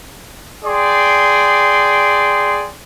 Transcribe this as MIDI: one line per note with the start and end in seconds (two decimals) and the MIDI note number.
0.64 2.69 68
0.64 2.69 74
0.64 2.69 79
0.64 2.69 84